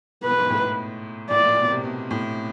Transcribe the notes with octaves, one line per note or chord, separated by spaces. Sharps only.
B2 B4
G#2
A2
A2 D5
A#2
B2
C3
B2
A2